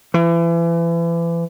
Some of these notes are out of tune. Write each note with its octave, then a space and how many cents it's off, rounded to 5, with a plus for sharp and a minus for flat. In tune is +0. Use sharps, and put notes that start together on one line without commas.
E3 +35